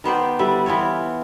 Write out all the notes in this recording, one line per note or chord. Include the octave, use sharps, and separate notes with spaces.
D#3 B3 C5 D5
D3 G3 E4
E3 B3 F4 C#5